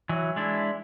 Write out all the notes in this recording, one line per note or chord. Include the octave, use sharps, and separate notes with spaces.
E3 F#3
G#3 D4 E4